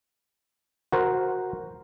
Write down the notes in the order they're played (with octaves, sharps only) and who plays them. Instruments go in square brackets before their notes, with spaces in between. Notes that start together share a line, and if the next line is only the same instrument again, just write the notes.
[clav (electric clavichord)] F#4 A#4 C5